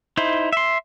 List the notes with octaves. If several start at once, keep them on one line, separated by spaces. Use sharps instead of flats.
D#4 E4 C5
E5 C6